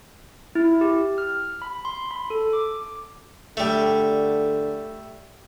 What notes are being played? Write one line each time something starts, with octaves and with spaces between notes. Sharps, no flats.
E4
G4
F6
B5
C6
B5
A4
D6
D3 G3 A3